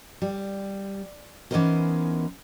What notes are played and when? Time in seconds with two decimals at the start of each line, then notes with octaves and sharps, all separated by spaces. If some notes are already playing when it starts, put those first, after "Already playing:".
0.22 G3
1.51 E3 B3 C#4 D#4 A#4 C5